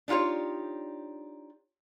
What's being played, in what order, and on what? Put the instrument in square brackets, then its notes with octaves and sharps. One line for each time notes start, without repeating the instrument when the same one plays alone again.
[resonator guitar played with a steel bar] D4 D#4 F4 G4 C#5